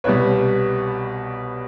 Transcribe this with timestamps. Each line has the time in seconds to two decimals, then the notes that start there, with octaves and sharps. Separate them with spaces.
0.04 C2 B2 G3 B4 C#5